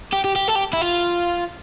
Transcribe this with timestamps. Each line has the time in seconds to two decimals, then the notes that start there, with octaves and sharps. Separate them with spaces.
0.13 G4
0.24 G4
0.36 G4
0.48 A4
0.55 G4
0.73 E4
0.81 F4